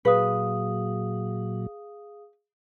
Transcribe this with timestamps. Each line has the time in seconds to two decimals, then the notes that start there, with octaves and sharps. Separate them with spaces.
0.05 A#2 F#3 G#4 B4 F5 D#6